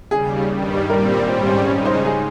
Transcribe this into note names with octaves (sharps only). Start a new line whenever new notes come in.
D#2 C#3 G3 G#4
G2 D#3 G3
A#2 G3 C4 A#4
G#2 G3 C#4 C5
C5
C#3 G#3 D#4 C#5
C5
G#4